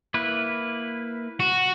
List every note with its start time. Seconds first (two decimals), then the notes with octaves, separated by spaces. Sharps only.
0.14 A#3 E4 B4
1.40 F#4